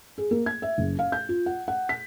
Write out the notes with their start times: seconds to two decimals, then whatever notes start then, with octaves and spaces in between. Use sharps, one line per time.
0.18 G#4
0.31 A#3
0.46 G#6
0.62 E5
0.78 F#1
0.99 F5
1.12 G6
1.29 F4
1.46 F#5
1.68 F#5
1.89 B6